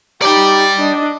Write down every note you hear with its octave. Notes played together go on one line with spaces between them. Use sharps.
D#4 G4 D5 G5
D4 D#5